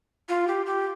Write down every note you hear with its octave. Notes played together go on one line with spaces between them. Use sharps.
F4
G4
G4